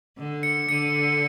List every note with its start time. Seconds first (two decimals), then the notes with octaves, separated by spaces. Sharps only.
0.18 D3
0.43 C#7
0.69 D3 C#7